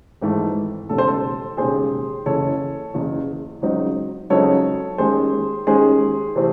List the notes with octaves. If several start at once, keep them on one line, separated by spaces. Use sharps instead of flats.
G#1 G#2 E3 A3
E1 D#2 C#3 A4
C5
A4
E1 D#2 C#3 G#4 C5
F#1 E2 C#3 A4 C#5
F#1 E2 C#3
C#2 C#3 F#3 C4 D#4
C#2 C#3 F#3 C4 D#4 A4 C#5
D#2 D#3 G#3 C#4 G#4 C5
D#2 D#3 G#3 C#4 G#4 C5
C3 E3 A3 C4